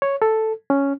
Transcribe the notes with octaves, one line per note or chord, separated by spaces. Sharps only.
C#5
A4
C#4